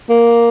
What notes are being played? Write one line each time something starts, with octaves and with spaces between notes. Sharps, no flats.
A#3